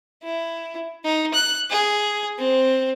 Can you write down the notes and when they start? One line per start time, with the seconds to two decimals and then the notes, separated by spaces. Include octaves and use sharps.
0.23 E4
1.05 D#4
1.34 F#6
1.70 G#4
2.38 C4